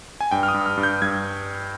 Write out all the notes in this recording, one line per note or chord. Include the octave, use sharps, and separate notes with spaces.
G#5
G2 G5
F6
D#6
G2
F6
G2
G6
G2 G#6